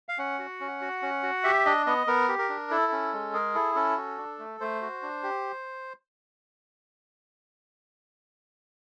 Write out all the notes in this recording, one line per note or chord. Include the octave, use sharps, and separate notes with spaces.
F5
C#4 F#5
F#4
C#4
F#4
C#4
F#4
G4 E5
D4 D#5
B3 D#5
B3 A#4
G4
A#4
D4
E4 A4
C#4
G#3
G#4 A#4
E4 A4
C#4 A4
F#4
D4
A3
A3 C5
F#4
D4
G4